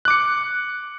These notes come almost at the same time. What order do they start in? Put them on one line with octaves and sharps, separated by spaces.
F#6 D6 C#7